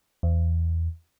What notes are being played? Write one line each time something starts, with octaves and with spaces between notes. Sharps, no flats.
E2